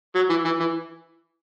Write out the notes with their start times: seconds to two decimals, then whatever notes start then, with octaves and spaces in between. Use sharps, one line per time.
0.16 F#3
0.30 E3
0.45 E3
0.60 E3